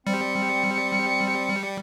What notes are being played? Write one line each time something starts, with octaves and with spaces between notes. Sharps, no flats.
G3 C4 C#7